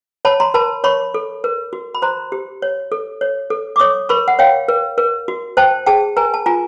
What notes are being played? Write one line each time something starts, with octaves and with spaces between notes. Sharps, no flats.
C#5 A5 B5
A#5 C6
A#4 A5 B5
C#5 B5 C#6
A4
A#4
F#4
B5
C5 A#5 C6
G4
C#5
A4
C#5
A4
D6
C#5 C#6 D#6
A#4 B5 C#6
F#5
C#5 F5 G5
A#4
A#4
F#4
C5 G5 A5
G#4 G5 A5
A#4 G#5 A#5
A5
F4 G#5 A#5